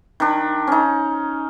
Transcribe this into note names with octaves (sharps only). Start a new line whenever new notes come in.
D#3 D4
C#4 D#4